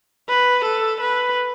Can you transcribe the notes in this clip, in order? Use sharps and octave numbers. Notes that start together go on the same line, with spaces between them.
B4
A4
B4